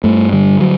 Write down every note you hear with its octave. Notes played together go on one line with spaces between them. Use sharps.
G2 A3
D3 G3
F#3